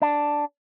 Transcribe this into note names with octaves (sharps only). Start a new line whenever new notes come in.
D4